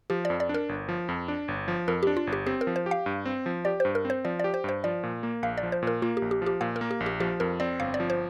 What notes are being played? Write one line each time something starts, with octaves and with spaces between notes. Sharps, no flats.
F3 G4
F2 D5
D5
D4
A#4
G1
F3
F2
D4
G1
F3
F2 A#4
D4 G4
F4
G1
G4
C4 G4
A#4
F3
C5
G4
F5
G2
C4
F3
G4 D5
G2 C5
A#4
C4
C5
F3 D5
G4 D5
C5
G2 C5
F3 D5
A#2
A#3
A#1 F5
D5
F3
C5
A#2 A#4
A#3 F4
A#1 G4
G4
F3 G4
A#2 F5
A#4
A#3
G4
A#1
G4
F3 G4
F2 A#4
C4 D5
G1 F5
D5
F3
C5